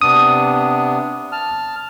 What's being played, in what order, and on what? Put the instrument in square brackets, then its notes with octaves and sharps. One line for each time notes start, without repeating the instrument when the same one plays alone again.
[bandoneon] C3 B3 D4 [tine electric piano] D#6
[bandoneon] A5 F6